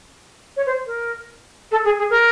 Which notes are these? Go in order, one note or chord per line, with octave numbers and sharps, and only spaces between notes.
C#5
C5
A#4
A4
G#4
G#4
A#4